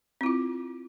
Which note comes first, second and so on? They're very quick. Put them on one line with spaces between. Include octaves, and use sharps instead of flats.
C4 E4 F4